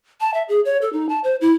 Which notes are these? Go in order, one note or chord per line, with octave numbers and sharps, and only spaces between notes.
A5
E5
G#4
C#5
A4
D#4
A5
C5
E4